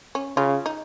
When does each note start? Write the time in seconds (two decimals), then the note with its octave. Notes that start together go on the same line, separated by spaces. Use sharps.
0.15 C#4
0.37 C#3 F4
0.66 D#4